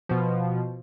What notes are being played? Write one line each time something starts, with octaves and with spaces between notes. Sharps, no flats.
B2 F3